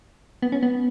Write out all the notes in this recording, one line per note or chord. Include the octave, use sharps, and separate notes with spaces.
B3
C#4
B3